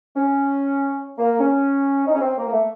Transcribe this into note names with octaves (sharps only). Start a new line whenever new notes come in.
C#4
A#3
C#4
D#4
C#4
C4
A#3
A#3
A3